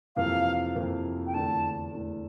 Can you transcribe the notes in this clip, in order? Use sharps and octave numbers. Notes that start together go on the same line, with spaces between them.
F2 C3 E3 A#3 F5
F2 C3 E3 A#3
G5
E2 D3 A3 A5
E2 D3 A3